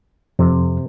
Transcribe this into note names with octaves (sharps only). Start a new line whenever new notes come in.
F2 C3